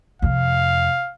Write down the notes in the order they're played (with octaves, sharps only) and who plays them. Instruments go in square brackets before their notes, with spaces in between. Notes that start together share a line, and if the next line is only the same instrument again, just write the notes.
[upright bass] F2 C3 [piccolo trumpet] F5